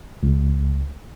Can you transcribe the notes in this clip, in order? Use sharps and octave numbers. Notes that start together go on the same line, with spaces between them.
C#2